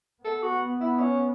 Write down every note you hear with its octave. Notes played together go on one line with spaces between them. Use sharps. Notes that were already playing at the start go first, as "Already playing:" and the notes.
B3 A4
F#4
E4
C#4